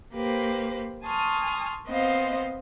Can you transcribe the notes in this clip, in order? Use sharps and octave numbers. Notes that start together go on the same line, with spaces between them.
A#3 G4 B4 C5
G#5 A5 C6 C#6 D#6 F6
B3 C4 C5 D#5 F5